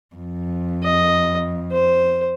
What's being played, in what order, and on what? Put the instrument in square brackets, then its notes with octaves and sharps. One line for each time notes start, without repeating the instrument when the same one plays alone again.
[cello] F2
[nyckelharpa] D#5
C5